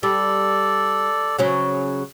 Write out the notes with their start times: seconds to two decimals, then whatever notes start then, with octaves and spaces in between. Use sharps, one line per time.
0.03 G3 A4 D5
1.38 C#3 F#3 C#4